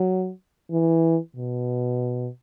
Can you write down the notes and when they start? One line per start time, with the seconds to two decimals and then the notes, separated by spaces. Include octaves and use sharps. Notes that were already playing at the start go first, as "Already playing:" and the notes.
Already playing: F#3
0.71 E3
1.36 B2